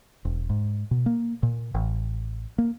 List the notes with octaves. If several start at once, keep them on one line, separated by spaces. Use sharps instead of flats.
E1
G#2
B2
A#3
A#2
A1
A#3